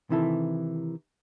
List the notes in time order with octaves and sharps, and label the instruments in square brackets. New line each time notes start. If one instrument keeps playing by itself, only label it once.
[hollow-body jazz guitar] C3 D#3 E3 E4 A4